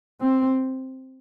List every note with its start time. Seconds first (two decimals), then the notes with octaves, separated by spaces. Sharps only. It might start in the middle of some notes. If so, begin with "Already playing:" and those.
0.21 C4